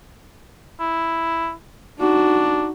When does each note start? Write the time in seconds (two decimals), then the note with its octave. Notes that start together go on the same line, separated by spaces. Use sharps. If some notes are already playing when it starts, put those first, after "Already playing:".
0.80 E4
1.99 D4 D#4 F#4